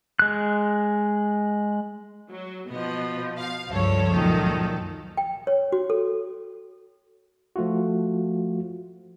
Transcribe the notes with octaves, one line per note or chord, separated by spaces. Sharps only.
G#3 F#6
F#3
B2 F3 B3 D#5
F5
C#2 G2 F3 A4 C#5
F#2 A#2 D#3
G5
C#5
F#4
A4
F3 A3 F4 F#4